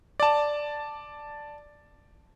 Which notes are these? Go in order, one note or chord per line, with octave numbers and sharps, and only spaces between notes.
D5 A5